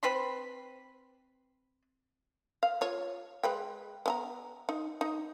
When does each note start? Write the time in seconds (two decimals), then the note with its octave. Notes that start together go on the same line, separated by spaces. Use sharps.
0.03 C4 B4 B5 C6
2.63 F5
2.81 F4 C#5
3.43 G#3 B4 G5
4.06 B3 G#5 A#5
4.69 D#4
5.01 D#4